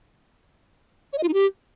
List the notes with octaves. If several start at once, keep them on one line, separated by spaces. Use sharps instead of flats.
C#5
D#5
F4
D#4
G4